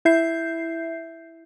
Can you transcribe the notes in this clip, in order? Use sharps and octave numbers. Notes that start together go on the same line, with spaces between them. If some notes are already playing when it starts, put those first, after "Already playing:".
E4 E5 G6 C7